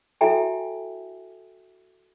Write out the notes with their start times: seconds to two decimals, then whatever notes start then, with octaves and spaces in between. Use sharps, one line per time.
0.21 E4 F#4 A4 E5 G5 G#5